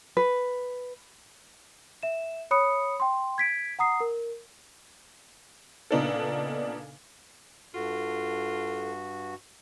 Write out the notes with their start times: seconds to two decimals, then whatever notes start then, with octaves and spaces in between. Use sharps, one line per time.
0.17 B4
2.03 E5 E7
2.51 C#5 B5 D#6 C#7
3.00 G5 C6
3.38 G#6 B6 D7
3.79 F#5 A#5 D#6 C7
4.00 A#4
5.91 A#2 C#3 B3 D4 D#4 A4
7.74 G2 F4 F#4 A4